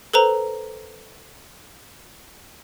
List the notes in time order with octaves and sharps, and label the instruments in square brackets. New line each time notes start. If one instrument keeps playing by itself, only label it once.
[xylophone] A4 B4 C5 A#5